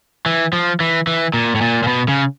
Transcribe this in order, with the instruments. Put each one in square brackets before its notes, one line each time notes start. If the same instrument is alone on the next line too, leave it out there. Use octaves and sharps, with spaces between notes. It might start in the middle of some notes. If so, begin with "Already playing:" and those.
[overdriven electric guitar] E3
F3
E3
E3
A#2
A2
A#2
A#2
B2
C#3